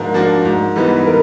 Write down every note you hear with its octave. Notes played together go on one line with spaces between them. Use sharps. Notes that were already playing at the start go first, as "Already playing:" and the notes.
Already playing: G#2 F3 A#3 D4 F#4 A#4
F3 A#3 D4 F#4
G#2
E3 G3 B3 D#4
A#4